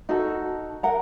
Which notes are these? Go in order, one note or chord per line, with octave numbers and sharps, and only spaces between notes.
D#4 F#4 A4
A#4 F#5 A#5